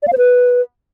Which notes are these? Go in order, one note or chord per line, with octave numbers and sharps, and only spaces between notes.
D5
F5
C5
B4